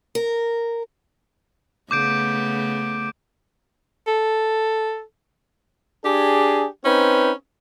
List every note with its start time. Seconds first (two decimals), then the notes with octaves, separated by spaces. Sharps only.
0.15 A#4
1.91 C#3 A3 B3 D6 G6 D7
4.07 A4
6.04 D4 G4 G#4
6.85 C4 C#4 D#4 B4